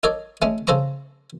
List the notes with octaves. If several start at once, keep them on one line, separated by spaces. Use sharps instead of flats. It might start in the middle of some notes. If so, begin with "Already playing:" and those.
D#4 A4 A#4 C#5 D5
G#3 A3 C#4
C#3 A4 C5 A#5 C#6